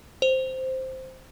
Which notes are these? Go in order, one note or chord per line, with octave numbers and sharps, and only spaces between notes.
C5